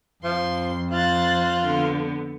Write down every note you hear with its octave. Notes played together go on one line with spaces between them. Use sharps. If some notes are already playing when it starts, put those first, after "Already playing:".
F2 F3 C6
F4 C5 F#6 A6
D3 B3